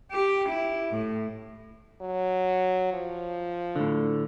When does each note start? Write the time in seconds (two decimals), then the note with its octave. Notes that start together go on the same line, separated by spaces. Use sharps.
0.11 G4
0.49 E4
0.91 A2
2.01 F#3
2.93 F3
3.76 A2 D3